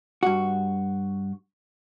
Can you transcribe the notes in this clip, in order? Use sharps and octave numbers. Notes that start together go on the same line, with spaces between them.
G2 F#4